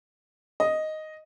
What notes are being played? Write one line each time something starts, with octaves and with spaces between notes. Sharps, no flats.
D#5